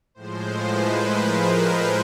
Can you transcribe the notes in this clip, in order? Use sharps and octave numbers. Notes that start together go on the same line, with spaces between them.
A2 F3 G#3 C5
B4
A#4